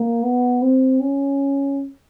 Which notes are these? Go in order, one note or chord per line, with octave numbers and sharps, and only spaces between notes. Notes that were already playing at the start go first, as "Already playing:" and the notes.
Already playing: A#3
B3
C4
C#4